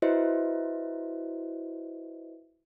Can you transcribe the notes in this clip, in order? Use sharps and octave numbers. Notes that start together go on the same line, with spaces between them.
E4 F#4 B4 C5 D#5 E5